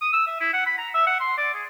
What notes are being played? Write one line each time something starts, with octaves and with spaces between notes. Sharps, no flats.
D#6
E6
E5
E4
F#5
B5
A#5
E5
F#5
C6
D5
G#4